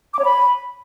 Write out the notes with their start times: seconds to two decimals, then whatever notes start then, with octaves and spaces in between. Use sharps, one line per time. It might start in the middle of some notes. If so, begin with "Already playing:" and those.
0.14 D6
0.19 C#5
0.25 B5